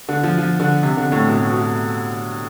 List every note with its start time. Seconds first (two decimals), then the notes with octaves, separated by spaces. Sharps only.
0.09 D3
0.23 F3
0.38 F3
0.60 D3
0.83 C3
0.97 D3
1.12 A2
1.28 B2
1.38 A2
1.49 B2